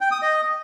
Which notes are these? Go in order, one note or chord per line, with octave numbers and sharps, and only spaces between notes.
G5
D#6
D#5